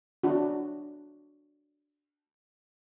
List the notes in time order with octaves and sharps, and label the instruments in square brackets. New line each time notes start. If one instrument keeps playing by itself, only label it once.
[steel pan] D4 F#4